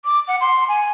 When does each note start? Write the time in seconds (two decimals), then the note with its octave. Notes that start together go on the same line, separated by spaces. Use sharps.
0.05 D6
0.28 F#5
0.41 C6
0.68 G#5